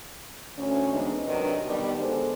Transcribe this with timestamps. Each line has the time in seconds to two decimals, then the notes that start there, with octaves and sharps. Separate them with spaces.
0.57 D2 C#4
0.92 E3 G#3 B3 C4 D4 D#4
1.27 C3 D#3 F#3 D4 B4
1.65 B2 D#3 G3
1.98 D3 G#3 B3 G#4 A4 C5